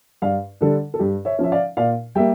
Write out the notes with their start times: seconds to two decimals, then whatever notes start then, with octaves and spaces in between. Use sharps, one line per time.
0.22 G2 D5 F5
0.61 D3 G3 D4 A4
0.94 A4
0.99 G2 G4
1.25 C#5 E5
1.39 F3 C#4 E5
1.52 D5 F5
1.77 A#2 D5 F5
2.15 G3 A#3 E5 G5